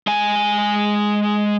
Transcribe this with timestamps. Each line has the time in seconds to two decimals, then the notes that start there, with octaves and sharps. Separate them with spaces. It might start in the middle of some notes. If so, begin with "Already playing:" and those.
0.07 G#3 G#5